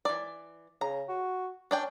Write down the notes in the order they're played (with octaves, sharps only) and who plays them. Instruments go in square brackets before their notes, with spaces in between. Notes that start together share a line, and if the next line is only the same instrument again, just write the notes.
[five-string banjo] E3 D5
[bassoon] C#3 [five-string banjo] A#5
[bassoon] F#4
[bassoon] C#4 [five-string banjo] D4 D5 G5